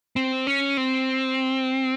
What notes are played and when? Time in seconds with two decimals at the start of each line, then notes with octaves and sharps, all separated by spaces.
0.16 C4
0.47 C#4
0.77 C4